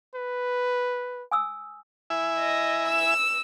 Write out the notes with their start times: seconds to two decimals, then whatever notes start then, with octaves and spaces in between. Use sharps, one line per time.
0.15 B4
1.31 G#5 D#6 E6
2.10 E4 E5 G#5
2.40 D#5
2.88 E6